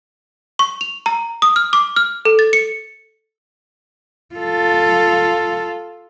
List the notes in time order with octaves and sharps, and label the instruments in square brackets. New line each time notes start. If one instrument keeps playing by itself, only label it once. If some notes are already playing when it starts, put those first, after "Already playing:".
[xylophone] C#6
F7
A#5
D#6
F6
D6
F6
A4
A6
C#7
[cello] F4 A4